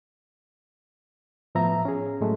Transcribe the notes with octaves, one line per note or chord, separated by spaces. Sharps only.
A2 F3 B3 E5 A#5
C#4 G#4
A2 F#3 G#3 A3